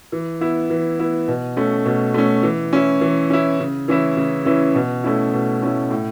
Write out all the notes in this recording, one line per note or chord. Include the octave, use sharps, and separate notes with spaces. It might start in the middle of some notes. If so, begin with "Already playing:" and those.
E3
B3 E4
E3
B3 E4
B2
A3 C#4
B2
A3 C#4
E3
C#4 E4
E3
C#4 E4
C#3
E3 C#4 E4
C#3
E3 C#4 E4
B2
A3 C#4 E4
B2
A3 C#4 E4
A2